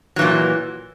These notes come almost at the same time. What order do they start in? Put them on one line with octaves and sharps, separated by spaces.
F#3 E3 A#2